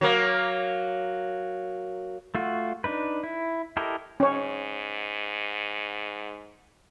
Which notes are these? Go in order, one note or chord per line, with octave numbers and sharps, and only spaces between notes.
F#3 A#3
A3 F4 F#4
D4 D#4 B4
E4
E4 G4 A4 A#4 D#5
G#2 C#4 C#5